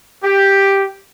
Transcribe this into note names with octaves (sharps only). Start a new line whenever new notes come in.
G4